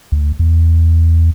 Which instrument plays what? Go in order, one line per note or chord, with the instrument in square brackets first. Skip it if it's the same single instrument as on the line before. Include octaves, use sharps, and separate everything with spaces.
[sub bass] D2
E2